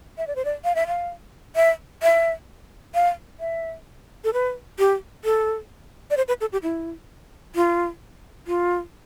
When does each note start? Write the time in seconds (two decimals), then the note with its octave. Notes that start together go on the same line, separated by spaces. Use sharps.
0.18 E5
0.27 D5
0.36 C5
0.45 D5
0.64 F5
0.75 E5
0.87 F5
1.56 E5
2.03 E5
2.95 F5
3.40 E5
4.24 A4
4.33 B4
4.79 G4
5.25 A4
6.10 D5
6.17 C5
6.28 B4
6.41 A4
6.52 G4
6.63 E4
7.55 F4
8.47 F4